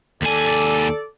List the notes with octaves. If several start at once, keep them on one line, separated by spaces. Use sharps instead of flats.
D#2 A4 D5 G#5